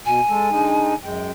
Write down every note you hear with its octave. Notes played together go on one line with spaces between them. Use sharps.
B2 G#5
G#3 A4
D3 G#3 D#4
F#2 G#3 G5